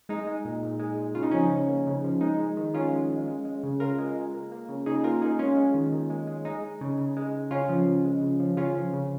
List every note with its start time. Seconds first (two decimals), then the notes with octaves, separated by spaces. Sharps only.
0.09 G#3 D#4
0.27 G#3
0.45 A#2
0.63 A#2
0.80 G#3
0.98 G#3
1.15 C#3 F4
1.23 D#4
1.31 F3 C#4
1.39 D#4
1.51 C#3
1.68 A#3
1.87 C#3
2.04 F3
2.21 G#3 D#4
2.39 G#3
2.57 D#3
2.74 D#3 C#4 F4
2.92 G#3
3.10 G#3
3.28 G#3
3.45 G#3
3.63 C#3
3.80 C#3 F4 A#4
3.98 G#3
4.15 G#3
4.34 A#3
4.52 A#3
4.69 C#3
4.86 C#3 D#4 G#4
5.03 A#3 F4 A#4
5.22 A#3 D#4 G#4
5.39 G#3 C#4 F4
5.57 G#3
5.74 D#3
5.92 D#3
6.10 G#3
6.27 G#3
6.45 G#3 D#4
6.64 G#3
6.81 C#3
6.98 C#3
7.17 G#3
7.33 G#3
7.51 C#3 C#4 F4
7.69 F3
7.87 C#3
8.05 G#3
8.22 C#3
8.40 F3
8.57 C#3 C#4 F4
8.75 F3
8.93 C#3